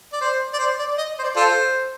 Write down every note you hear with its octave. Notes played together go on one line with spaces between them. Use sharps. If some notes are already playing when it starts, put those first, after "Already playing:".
D5
C5
D5
C5
D5
D#5
C5
D5
F4 A4 C5